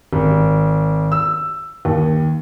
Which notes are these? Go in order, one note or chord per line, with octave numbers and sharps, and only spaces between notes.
G#1
E6
D#2